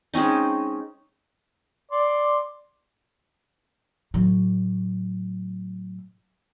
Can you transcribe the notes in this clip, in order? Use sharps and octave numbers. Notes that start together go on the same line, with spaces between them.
G#3 C4 C#4 D#4
D5 C6
A2 F#3